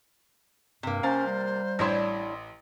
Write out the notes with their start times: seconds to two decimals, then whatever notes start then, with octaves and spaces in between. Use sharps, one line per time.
0.83 G2 C3 A#3
1.03 C#4 C5 F5 A#5 A6
1.27 G3
1.79 A1 D4 E4 C#5 C6